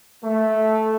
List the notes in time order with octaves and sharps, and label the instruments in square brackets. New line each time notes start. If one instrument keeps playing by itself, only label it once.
[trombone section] A3